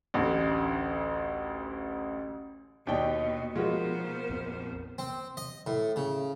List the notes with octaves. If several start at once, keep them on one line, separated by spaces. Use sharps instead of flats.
A1 D2
D#2 B2 D4 D#5 G5
B2 F3 G#3 B3 F4 F#4 A#4 C5
A#1 F2 C4
C4
D#5
A2
C#3